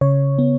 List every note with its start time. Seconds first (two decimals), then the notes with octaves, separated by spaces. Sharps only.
0.01 C#3 C#5
0.39 B3